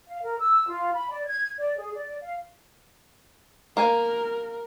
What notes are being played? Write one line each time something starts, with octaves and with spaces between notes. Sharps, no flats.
F5
A#4
E6
F4
B5
D5
G#6
D5
G#4
D5
F5
A#3 A#4 F5 G#5